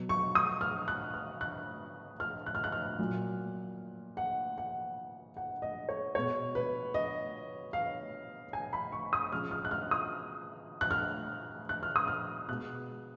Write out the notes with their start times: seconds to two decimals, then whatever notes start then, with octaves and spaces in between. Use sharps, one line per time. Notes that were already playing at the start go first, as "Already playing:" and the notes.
Already playing: B2 F#3
0.09 C#6
0.35 D#6
0.61 F6
0.88 F#6
1.14 F6
1.41 F#6
2.20 F6
2.46 F#6
2.55 F6
2.64 F#6
2.72 F6
2.99 A#2 F#3
4.17 F#5
4.58 F#5
5.37 F#5
5.62 D#5
5.89 C#5
6.15 B2 G#3 C#5
6.55 B4
6.94 D#5
7.73 F5
8.53 G#5
8.73 B5
8.92 C#6
9.13 D#6
9.32 C#3 F3 G#3 F6
9.51 F6
9.65 F#6
9.71 F6
9.91 D#6
10.81 F#6
10.91 F6
11.69 F#6
11.83 F6
11.96 D#6
12.08 F6
12.48 B2 G#3 F#6